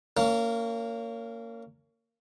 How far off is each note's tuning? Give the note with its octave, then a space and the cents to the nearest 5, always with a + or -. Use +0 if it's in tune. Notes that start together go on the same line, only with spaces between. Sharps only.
A#3 -20 C#4 +20